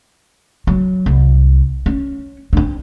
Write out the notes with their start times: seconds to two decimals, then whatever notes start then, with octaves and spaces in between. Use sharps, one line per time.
0.67 F#3
1.06 C2
1.86 C#4
2.53 C4 D4